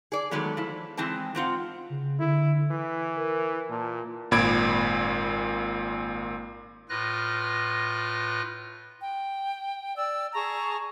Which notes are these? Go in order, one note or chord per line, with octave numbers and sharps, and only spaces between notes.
G#4 D5
D#3 F#3 G#3 A3 B3
F3 E4
E3 G#3 C4 G5 A5
G#2 C4 F4 F#5
C#3
D3 E4
E3 B6
A#4
A#2 A5
G#1 A#2 B5 G#6 D7
A2 F4 B4 F6 F#6 A#6
G5
D5 E6
G#4 A5 A#5 C#6